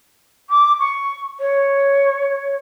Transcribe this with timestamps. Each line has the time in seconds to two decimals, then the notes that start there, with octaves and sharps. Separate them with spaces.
0.50 D6
0.79 C#6
1.40 C#5